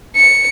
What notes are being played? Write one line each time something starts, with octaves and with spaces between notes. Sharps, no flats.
C#7